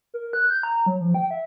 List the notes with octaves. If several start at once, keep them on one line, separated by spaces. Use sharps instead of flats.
A#4
F#6
G6
A#5
F#3
F3
G5
E5